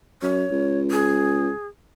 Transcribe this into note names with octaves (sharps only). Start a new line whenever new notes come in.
F#2 C#5
C#2
G#4